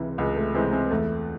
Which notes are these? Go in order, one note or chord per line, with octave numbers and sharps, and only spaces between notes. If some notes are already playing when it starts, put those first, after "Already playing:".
Already playing: C#2 C3 E3
C#2 G#3
A3
C3 E3 G#3 C4
G#3 C4
E2 A3